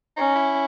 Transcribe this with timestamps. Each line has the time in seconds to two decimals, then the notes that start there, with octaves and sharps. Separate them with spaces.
0.17 C#4 D#4
0.36 E4